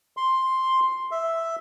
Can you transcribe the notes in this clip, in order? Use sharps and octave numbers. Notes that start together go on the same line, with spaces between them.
C6
E5